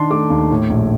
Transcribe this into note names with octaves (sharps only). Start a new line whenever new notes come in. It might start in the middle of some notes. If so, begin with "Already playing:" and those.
Already playing: D#3 D4 A5 C6
A3 D6
D#2
A2
A#1